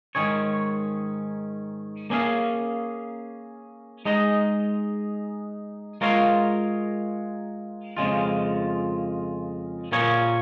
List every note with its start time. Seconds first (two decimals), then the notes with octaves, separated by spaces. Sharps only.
0.15 G#2 D#3 C#4 G#4 C#5
2.10 A#3 C#4 G#4 F5
4.05 G#3 D#4 G#4 D#5
6.01 G#3 F4 A#4 C#5 F5
7.97 F2 C#3 G#3 F4
9.92 A#2 A#3 C#4 G#4 C#5